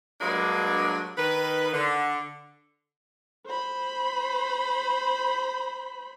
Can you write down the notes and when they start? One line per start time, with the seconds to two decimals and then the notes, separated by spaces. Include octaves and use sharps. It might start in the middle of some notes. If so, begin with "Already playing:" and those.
0.21 G2 F#3 G#3 A#3 D4
1.18 D#3 B4
1.73 D3
3.46 C5 B5